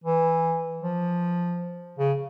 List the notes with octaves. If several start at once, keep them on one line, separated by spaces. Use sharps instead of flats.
E3
F3
C#3